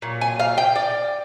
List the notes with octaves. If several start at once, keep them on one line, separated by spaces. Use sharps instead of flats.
A#2 F#3
G#5
F5
G5
D5